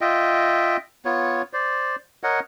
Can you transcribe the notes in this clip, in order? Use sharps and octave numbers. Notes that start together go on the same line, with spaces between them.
F4 D#5 E5 G5
B3 F4 C#5
C5 D5
A#4 C#5 D#5 F#5